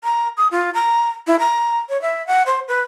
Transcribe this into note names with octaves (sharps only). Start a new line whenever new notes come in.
A#5
D#6
F4
A#5
E4
A#5
C#5
E5
F#5
C5
B4